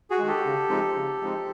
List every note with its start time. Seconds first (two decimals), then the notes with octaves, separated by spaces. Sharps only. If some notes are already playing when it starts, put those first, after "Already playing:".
0.11 F#4 G#4
0.18 D#3 G#3
0.27 G4 A4
0.45 C#3
0.69 F3 G#3 C4 D#4
0.95 C#3
1.21 F3 G#3 C4 D#4